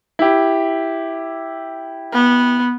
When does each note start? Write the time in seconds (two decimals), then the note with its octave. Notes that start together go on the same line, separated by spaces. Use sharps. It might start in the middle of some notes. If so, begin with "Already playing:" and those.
0.19 E4 G4
2.13 B3